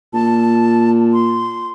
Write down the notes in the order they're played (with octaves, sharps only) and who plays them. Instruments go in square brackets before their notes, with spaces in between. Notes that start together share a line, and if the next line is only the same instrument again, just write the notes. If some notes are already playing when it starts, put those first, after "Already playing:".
[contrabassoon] A#2 [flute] A5
[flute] C6